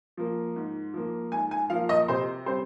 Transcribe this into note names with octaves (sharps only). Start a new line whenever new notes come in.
F3 A#3
G#2
F3 A#3
G#2 G#5
G#5
F3 A#3 F5
D#5
C3 C5
G3 C4 C5